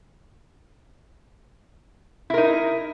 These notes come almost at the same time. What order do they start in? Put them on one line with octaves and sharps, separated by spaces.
E4 A#4 D#4